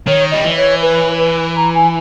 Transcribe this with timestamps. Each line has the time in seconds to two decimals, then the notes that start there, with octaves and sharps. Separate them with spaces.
0.07 D#3 C#5
0.31 G3 D#5
0.45 E3
0.57 C#5
0.82 B4
1.19 B4
1.56 A#5
1.75 G#5